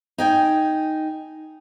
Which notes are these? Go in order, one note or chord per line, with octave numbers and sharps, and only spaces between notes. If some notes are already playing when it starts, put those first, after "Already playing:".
D#4 G5 G#5